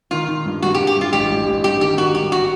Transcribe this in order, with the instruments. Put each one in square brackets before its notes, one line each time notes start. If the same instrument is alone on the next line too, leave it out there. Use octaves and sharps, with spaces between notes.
[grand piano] D#3 [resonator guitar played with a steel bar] F4
[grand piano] D#3
G2
[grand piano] G2 [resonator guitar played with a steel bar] F#4
[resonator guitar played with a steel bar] G4
[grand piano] G2
[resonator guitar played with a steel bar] G4
[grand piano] G2 [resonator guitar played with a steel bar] F4
[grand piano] A1 [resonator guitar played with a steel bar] G4
[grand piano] A1
A1
[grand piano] G2 [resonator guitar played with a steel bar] G4
[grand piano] D#3 [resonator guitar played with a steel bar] G4
[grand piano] D#3 [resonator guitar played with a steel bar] F#4
[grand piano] G#1 [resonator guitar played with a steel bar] G4
[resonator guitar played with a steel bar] F#4